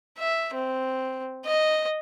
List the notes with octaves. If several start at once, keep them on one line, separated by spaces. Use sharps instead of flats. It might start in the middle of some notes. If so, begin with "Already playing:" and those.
E5
C4
D#5